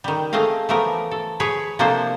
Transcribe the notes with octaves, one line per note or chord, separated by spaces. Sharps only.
D#3 G3
G#3 A3 C4 D#5 F5
E3 F3 A3 B3 A#4
A4
G#4 B4 C#5
C3 F3 A#3 D4 A4 C5